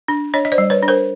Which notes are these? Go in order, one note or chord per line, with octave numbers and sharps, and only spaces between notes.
D4
D4 C#5 D#5
D#5
C5 D5
G3
B4 C#5
D4
A#4 C5